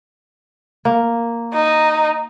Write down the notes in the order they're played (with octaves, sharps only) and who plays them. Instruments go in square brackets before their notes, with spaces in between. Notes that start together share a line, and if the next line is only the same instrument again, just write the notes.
[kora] A#3
[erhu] D#4